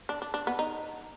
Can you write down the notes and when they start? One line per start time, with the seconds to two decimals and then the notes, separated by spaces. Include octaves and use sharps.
0.09 D4
0.22 D4
0.34 D4
0.47 B3
0.59 D#4